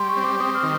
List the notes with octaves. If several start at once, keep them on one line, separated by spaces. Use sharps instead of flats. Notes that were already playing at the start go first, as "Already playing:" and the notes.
Already playing: G3 C6
C#6
C4
D6
C4 D#6
F6
D#3